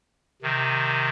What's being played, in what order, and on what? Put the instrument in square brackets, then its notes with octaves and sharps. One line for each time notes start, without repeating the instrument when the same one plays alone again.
[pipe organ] C3 D#3